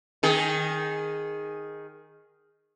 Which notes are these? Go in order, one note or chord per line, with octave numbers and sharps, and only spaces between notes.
D#3 G#4